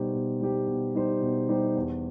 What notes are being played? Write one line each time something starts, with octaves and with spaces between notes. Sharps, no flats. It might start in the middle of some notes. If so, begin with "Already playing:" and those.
Already playing: B2 G3 D#4 G4 C5
B2
G3 D#4 G4 C5
B2
G3 D#4 G4 C5
B2
G3 D#4 G4 C5
E2